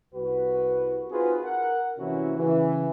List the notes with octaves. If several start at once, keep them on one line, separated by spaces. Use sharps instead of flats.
C2 F#4 B4
C4 D#4 F4 F#4 G#4 B4
A#4 F#5
C3 E3 A#3 C#4 E4 F#4
C#3 E3